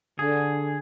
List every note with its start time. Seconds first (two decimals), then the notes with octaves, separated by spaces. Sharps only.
0.19 D3 G#4